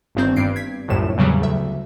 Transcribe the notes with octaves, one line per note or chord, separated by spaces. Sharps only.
G1 G2 D#3 C4 G6
G2 C7 D7
G#6 B6
G1 C2 F#2 A2 E7
E2 C#3 F#3 G3
D2 E5